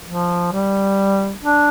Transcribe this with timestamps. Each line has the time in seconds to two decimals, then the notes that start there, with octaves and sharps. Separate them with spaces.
0.08 F3
0.53 G3
1.44 D4